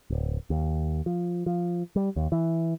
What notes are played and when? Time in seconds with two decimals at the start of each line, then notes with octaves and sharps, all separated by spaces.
0.10 D1
0.50 D#2
1.06 F3
1.46 F3
1.96 G3
2.16 D#2
2.32 E3